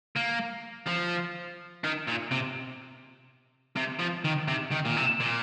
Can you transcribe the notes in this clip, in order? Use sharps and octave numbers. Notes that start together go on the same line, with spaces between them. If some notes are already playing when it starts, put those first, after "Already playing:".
A#3
F3
D#3
A#2
C3
C3
F3
D#3
C3
D#3
A#2
C3
A#2